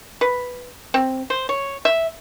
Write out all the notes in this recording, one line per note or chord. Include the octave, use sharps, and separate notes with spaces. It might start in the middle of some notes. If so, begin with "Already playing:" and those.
B4
C4
C5
C#5
E5